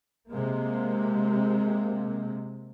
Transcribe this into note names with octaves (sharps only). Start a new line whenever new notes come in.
C3 G#3 A#3